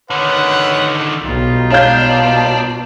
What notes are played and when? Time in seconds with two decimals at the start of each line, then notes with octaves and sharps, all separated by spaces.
0.10 D3 D#3 B4 C#5 F#5
1.24 B1 G3 D#4 F4
1.71 B2 D4 C#5 F5 G6